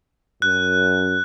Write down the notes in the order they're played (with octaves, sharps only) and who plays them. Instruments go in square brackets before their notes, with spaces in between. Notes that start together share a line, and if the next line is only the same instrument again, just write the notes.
[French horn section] F#2 [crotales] F#6